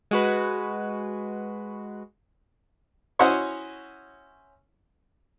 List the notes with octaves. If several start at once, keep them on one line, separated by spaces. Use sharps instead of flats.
G#3 F#4 B4
C#4 E4 F#4 C5 C#5 D#5